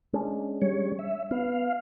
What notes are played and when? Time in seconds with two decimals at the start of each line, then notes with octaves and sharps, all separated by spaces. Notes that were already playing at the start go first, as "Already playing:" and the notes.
0.13 G#3 C#4 D4
0.62 G3 C#5
0.99 E5
1.31 B3 F5